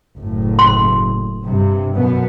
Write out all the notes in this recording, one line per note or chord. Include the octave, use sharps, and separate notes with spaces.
F#1 A2
C6
G2 C3
F#2 B2 B3